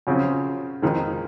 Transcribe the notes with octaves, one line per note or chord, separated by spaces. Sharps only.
F#2 C#3 F3 C4
F2 D#3 G#3